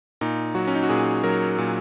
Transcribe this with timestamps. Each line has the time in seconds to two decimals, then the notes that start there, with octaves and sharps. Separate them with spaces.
0.21 A#2 D#4
0.55 F#3 F#4
0.67 C#4
0.75 D#4
0.83 F#4
0.89 A#2 G#4
1.24 F#3 A#4
1.58 A#2